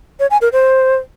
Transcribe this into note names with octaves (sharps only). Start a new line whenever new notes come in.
C#5
G#5
A#4
C5